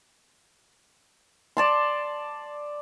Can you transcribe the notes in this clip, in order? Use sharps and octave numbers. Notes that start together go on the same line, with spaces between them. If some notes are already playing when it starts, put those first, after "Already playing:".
D5 A5 C6